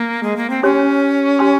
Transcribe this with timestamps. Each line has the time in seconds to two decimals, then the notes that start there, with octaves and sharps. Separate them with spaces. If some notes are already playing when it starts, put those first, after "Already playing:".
Already playing: A#3
0.23 G#3
0.37 A#3
0.50 C4
0.63 C#4 G4 C#5 G#5 C6
1.39 G4 C#5 G#5 C6